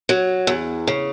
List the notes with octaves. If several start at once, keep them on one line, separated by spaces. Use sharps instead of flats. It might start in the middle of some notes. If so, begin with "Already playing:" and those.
F#3
E2
C#3